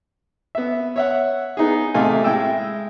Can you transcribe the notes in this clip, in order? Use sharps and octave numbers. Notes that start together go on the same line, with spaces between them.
B3 E5
C#5 E5 F#5
B3 D#4 G#4
A1 C3 A3 D#5 F5 G#5
G#3 E4 G5 E6